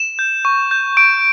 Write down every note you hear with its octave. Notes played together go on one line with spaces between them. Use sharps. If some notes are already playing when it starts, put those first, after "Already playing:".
Already playing: E7
G6
C#6
G6
C#6 D7